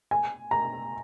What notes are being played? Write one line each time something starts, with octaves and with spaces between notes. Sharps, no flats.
G#5
A#5